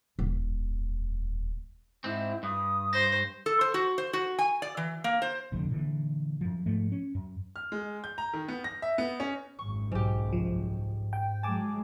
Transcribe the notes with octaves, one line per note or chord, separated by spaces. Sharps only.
D#1 F2
G#2 C4 E4
G2 D#6
C5 A#6
A4
C5
F#4
C5
F#4
G#5
D5
E3
A#3
C5
F1 A#1 F2 D3
A#2 D3 E3
F#2 F3
G#2 F3 A3
C#4
F#2
F6
G#3
G6
A#5
D#3
B3
A#6
E5
B3
C#4
G#1 F#2 C#6
B1 G#2 F#3 G4
C2 F3
G5
F#3 G#3 G#5 A5 D6